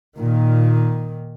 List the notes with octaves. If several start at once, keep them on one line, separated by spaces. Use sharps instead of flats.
A#2 D#3